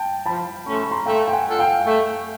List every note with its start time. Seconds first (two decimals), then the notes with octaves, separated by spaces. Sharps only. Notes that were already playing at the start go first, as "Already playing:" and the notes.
Already playing: G5 A5
0.26 F3 A5 B5
0.66 A3 C#4 C#6
0.75 C6
0.83 B5
0.91 A#5 C6
1.06 A3 F5 G5
1.28 G5
1.33 F#5 G#5
1.46 D4 F4 A4
1.59 F5 G5
1.86 A3